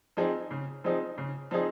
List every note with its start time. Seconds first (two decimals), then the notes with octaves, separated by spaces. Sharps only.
0.17 F3 C4 D#4 G#4
0.51 C#3
0.84 F3 C4 D#4 G#4
1.18 C#3
1.51 F3 C4 D#4 G#4